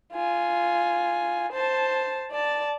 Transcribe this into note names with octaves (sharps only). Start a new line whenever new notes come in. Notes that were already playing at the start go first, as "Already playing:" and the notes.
F4 G#5
C5 A5
D5 A5